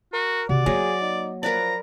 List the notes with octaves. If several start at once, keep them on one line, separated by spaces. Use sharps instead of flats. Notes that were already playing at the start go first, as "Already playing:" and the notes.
F#4 A#4
C3 D#3 F#4 D5
F#3 A#3 G#4
D#4
F3 A#4 B4 D5 A#5